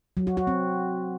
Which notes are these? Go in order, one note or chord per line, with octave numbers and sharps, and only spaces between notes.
F#3
F#4
F#4
C4